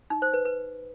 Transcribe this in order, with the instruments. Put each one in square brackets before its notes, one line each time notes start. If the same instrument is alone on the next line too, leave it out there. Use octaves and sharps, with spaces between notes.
[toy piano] D#4
C5
B4
B4